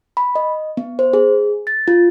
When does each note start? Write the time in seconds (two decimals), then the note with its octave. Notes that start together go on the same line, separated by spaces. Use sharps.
0.17 B5
0.35 D#5
0.77 B3
0.99 C5
1.13 G#4
1.67 A6
1.88 F4